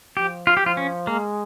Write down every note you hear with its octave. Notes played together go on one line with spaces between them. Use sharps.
F3 G4
F4
G4
F3 F4
C#4
G#3 A#3